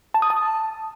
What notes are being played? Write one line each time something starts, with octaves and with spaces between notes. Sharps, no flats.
A5
D#6
A5